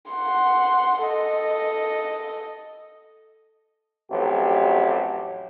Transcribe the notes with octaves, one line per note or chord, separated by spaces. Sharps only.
F#5 C6
A4 D#5
A1 F2 F#3 F#4 G4